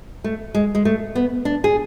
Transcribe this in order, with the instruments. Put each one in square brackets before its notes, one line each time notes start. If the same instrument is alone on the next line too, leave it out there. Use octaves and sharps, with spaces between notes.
[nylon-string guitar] A3
G#3
G#3
A3
B3
D4
G#4